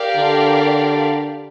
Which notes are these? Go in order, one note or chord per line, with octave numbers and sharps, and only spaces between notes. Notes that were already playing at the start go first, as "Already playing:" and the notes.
Already playing: G4 A#4 D5 F5
D3